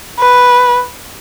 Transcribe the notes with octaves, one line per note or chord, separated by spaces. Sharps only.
B4